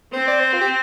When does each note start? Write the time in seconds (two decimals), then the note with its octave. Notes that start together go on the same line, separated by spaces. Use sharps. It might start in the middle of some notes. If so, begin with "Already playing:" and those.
0.13 C4 C5
0.27 D5
0.40 C5
0.53 F4
0.61 G4